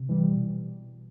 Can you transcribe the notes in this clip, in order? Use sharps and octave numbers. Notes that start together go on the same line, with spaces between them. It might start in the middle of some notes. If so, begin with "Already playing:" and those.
Already playing: C3
E3 G3
B2